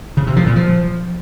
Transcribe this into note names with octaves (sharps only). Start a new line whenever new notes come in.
C#3
C3
F3
A#2
F3